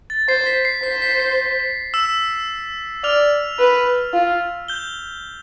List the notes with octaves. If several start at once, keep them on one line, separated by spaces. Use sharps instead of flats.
A6
C5 C7
B6
C7
C5 B6
B6
C7
E6 E7
D5 F6 F7
B4
F4
G6 G7